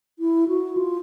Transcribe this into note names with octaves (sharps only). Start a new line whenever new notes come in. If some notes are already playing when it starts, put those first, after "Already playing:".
E4
F#4
F4